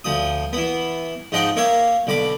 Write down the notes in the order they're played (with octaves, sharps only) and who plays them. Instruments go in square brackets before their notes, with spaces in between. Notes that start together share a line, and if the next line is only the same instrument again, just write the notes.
[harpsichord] D2 F3 D#6
E3 B3
G#2 F3 D#4 F#5 G5
A#3 C#5 E5 F5
B1 D3 B5 D6